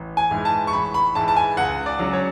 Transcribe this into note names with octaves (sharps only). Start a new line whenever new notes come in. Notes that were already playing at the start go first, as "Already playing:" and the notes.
Already playing: A1
G#5
G#2 E3 G#3
A5
C#6
A1 B5
B5
G#2 E3 G#3 A5
A5
G#5
C#2 F#5
D5
C#3 F#3
C#5